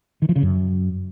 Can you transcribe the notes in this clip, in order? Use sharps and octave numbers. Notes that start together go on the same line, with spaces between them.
D#3
F3
C#3
F#2